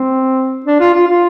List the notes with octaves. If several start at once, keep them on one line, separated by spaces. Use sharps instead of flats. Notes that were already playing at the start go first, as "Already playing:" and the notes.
Already playing: C4
D4
F4
F4
F4